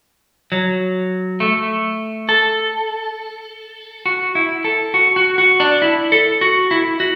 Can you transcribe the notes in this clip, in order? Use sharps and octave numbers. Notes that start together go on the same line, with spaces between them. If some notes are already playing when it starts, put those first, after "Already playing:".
F#3
A3
A4
F#4
E4
A4
F#4
F#4
F#4
D4
E4
A4
F#4
E4
F#4